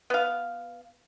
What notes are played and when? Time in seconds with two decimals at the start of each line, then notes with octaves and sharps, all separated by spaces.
0.10 B3 F5